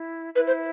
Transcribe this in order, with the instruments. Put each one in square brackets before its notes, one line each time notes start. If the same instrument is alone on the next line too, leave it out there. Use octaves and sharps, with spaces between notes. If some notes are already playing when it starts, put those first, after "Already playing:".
Already playing: [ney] E4
[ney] E4 [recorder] B4
[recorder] C5